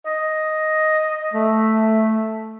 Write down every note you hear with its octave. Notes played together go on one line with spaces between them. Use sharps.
D#5
A3